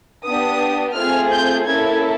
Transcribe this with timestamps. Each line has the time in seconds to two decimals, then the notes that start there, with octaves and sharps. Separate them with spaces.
0.24 B3 D4 G4 D#6
0.96 A3 C4 F4 G#4 F6
1.32 G6
1.67 A#3 C#4 E4 A4 G#6